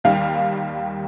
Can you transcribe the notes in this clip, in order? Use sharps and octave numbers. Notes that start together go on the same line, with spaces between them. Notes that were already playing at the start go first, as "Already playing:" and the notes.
D#2 D#3 G3 F5